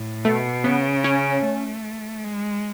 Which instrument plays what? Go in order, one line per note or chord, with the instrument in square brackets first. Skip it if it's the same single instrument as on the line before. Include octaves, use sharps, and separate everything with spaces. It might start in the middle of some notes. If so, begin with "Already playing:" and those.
Already playing: [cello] A2
[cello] B2 [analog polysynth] A3
[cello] C#3 [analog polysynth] B3
[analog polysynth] C#4
[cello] A3
G#3